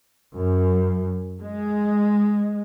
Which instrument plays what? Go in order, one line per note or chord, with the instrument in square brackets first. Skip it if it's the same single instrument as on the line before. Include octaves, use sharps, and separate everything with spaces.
[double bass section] F#2
G#3